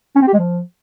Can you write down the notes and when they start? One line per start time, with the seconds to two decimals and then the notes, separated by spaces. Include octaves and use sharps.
0.16 C#4
0.21 C4
0.27 G4
0.33 G#3
0.39 F3